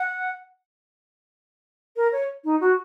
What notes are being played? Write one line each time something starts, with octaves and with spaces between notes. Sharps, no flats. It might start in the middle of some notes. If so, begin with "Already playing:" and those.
Already playing: F#5
A#4
C#5
D#4
F#4